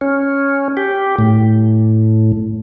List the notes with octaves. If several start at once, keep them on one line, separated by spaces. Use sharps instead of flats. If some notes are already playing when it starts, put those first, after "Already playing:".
C#4
G4
A2